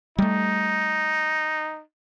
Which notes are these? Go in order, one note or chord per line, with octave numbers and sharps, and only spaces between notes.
G3 A3 D#4